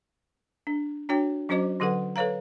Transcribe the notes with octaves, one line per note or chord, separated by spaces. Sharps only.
D4
D4 F#4 C#5 G5
F#3 C#4 F#4 C5 D#5 D6
D3 F#3 G4 A4 B4 F#5
A4 B4 C#5 F5 A#5